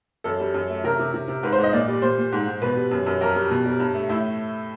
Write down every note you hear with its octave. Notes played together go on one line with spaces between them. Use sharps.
F#2 A4
G3
F#2
A3
C3 A#4
C3
C3
C3
G#2 B4
C5
G#2
D#5
A#2 D5
G3
A#2 C5
A#2
G#2
G#2
B2 B4
G3
F#2
F#2
F2 A#4
G3
B2
G3
G2
A3
A2 E4